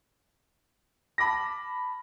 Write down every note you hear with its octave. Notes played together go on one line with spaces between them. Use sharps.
A5 B5 D6 A#6